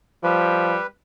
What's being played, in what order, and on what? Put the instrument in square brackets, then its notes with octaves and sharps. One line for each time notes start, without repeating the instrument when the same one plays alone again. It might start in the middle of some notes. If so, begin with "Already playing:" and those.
[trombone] F3 [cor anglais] G3 [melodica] B4